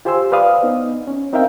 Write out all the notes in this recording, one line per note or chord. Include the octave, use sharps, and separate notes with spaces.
F4 G4 C5 G#5 C6 E6
B4 C5 D5 F5 D#6
B3 D#4
C#4
C4 D#4 A#4 E5 F5 G5